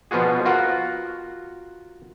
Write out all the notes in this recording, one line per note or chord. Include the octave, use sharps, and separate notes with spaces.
B2 F3 B3 F4 F#4 G#4
F4 F#4 A#4 F#5